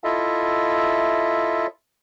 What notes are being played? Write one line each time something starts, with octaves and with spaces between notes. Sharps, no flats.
E4 F4 A4 D#5 E5